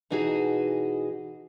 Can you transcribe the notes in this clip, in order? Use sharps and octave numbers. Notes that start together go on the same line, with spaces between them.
B2 E3 D#4 F#4 G#4